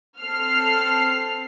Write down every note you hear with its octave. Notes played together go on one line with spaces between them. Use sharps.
C4 A4 F6 C7